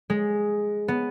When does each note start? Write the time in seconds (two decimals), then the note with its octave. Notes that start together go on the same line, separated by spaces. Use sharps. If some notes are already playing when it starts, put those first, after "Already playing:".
0.10 G#3
0.88 B3